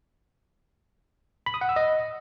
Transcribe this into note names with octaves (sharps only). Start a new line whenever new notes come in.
B5
D#6
F#5
E6
D#5